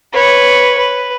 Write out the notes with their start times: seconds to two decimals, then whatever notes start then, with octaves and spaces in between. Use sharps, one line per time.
0.14 B4 C#5
0.78 B4